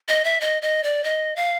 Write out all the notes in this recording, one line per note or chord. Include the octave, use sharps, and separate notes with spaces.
D#5
E5
D#5
D#5
D5
D#5
F5